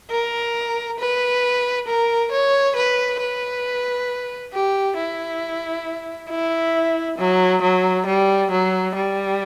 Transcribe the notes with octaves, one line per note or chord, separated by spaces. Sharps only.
A#4
B4
A#4
C#5
B4
B4
G4
E4
E4
F#3
F#3
G3
F#3
G3